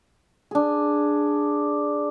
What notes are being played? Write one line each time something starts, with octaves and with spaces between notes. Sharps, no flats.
D4 G#4